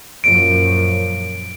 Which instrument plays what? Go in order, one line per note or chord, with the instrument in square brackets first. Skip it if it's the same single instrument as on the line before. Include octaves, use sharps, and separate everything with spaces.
[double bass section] F#2 A#2 F3 [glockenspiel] D7